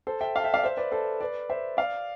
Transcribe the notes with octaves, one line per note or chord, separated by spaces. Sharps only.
A4 C5
E5 G5
F5 A5
E5 G5
D5 F5
C5 E5
B4 D5
A4 C5
B4 D5
C5 E5
D5 F5